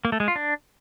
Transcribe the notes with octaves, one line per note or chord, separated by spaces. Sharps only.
A#3
A3
G#3
F4
D4